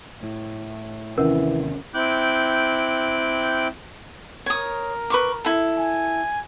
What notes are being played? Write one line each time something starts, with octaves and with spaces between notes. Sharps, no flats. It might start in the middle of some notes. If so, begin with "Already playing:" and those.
A2
D#2 C3 D#3 E3 C#4 A#4 F#5
C4 E4 G5 D6 F#6 G6
A#4 C#5 D#6
B4 C#6 D6
E4 A4
G#5